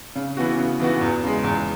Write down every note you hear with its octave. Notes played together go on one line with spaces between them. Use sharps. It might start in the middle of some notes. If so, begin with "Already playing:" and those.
C#3
E3 B3 F#4
C#3
E3 B3 F#4
E2
C#3 G#3
E2